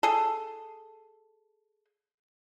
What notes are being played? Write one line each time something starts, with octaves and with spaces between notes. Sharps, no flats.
G#4 A4